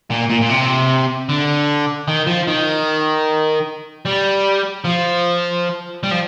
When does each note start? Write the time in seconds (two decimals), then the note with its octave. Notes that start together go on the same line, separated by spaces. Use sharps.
0.10 A#2
0.30 A#2
0.42 A#2
0.49 C3
1.29 D3
2.08 D#3
2.27 F3
2.48 D#3
4.06 G3
4.85 F3
6.03 G3
6.11 F3